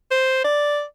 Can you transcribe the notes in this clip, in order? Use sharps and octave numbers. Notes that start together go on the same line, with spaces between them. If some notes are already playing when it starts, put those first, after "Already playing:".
C5
D5